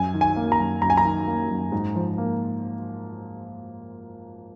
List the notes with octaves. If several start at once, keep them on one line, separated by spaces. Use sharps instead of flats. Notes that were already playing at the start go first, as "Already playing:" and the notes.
Already playing: F#2 G#5
D#3
G#5
A#3
A#5
F#2
F#2 A#5
G#5
A#5
D#3
A#3
F#2
G#2
F3
A#3